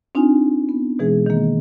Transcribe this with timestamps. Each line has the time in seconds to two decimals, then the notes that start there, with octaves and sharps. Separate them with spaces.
0.15 C4 D4 D#4 F4 G#5
0.69 B3
0.99 B2 E3 G#3 G#4
1.26 D#3 A#3